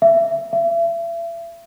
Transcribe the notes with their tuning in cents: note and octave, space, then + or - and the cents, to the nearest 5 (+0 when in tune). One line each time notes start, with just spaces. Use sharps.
E5 +20
E5 +35